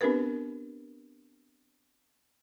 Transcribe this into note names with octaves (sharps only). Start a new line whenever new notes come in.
B3 C4 D4 G4 A#4 B4